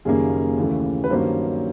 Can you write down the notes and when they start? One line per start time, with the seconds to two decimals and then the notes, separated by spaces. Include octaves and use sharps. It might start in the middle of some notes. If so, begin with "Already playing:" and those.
0.05 F#1 F#2 D#3 G3 A#3 G#4
0.57 D#2 C#3 E3 A3
1.04 B4
1.10 G2 D#3 F#3 A#3 C#4 C5